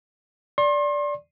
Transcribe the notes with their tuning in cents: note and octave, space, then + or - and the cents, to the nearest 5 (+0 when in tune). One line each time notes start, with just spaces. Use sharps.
D5 -10 C6 +40